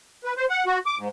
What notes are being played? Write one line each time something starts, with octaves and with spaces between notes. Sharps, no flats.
B4
C5
F#5
F#4
D6
G#2